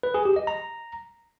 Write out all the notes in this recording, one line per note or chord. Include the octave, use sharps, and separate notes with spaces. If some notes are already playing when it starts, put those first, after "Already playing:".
B4
G#4
G4
D#5
A#5